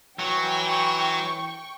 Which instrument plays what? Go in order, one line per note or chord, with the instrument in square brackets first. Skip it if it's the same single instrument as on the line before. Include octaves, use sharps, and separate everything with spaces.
[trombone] E3 [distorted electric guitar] F#3 [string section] G5 C#6